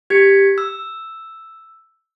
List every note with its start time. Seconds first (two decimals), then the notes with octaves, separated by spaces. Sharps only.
0.10 G4 G#6 B6 C#7
0.58 E6